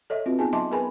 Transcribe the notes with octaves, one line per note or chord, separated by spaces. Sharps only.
A4 C#5 D#5 E5
C4 F4 F#4 B4
B3 D#4 F4 G#4 G#5 A5
F#3 D#5 E5 A5 C6 D6
B3 G#4 A#4 B4 G#5 B5